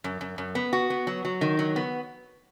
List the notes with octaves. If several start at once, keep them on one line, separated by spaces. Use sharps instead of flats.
F#2
F#2
F#2
B3
F#4
B3
F#3
F#3
D#3
F#3
B3